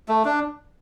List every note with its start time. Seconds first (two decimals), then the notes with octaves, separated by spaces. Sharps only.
0.08 A3
0.25 D4